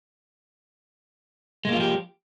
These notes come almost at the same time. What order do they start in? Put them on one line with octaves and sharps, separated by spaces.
G#3 A#3 F4 F3 G4